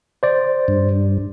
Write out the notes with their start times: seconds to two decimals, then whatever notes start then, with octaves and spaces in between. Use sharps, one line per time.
0.23 C5 D5
0.68 G2